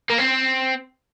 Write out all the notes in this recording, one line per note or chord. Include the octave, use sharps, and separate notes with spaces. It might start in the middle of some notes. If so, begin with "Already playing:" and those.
A#3
C4